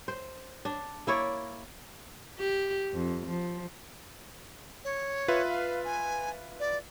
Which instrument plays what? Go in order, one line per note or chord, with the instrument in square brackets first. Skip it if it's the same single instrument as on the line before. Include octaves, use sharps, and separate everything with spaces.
[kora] C5
D4
A#3 E4 C#5 D5
[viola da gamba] G4
F2
F3
[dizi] C#5
[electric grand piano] F4 B4 E5
[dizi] F5
G#5
D5